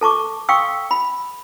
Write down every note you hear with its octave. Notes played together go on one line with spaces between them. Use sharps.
A4 A5 C#6 D6
F5 G5 C6 C#6 D#6 E6
B5